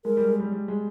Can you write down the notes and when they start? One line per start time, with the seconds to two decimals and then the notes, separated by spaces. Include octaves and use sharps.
0.05 G#3 A#4
0.17 G3
0.29 G#3
0.40 G3
0.52 G3
0.68 G#3